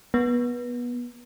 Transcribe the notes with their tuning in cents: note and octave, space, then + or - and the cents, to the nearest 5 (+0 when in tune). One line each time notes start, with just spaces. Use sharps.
B3 -25